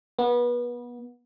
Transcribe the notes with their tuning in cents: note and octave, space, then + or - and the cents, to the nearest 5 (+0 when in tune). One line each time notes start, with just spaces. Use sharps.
B3 -30